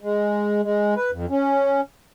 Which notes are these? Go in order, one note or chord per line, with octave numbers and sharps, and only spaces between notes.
G#3
G#3
B4
F2
C#4